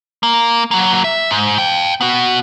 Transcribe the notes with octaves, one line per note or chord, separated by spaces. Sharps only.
A#3
F#3 A#3
E5
G#2
F5 G5
B3 F#4